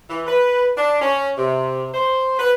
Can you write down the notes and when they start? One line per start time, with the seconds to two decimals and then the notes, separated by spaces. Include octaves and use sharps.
0.08 E3
0.26 B4
0.76 D4
1.00 C#4
1.37 C3
1.94 C5
2.38 B4